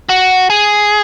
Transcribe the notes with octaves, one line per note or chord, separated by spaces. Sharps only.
F#4
G#4